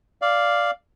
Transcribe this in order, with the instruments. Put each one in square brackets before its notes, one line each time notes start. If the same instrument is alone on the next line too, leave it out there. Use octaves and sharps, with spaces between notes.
[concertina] D5 F5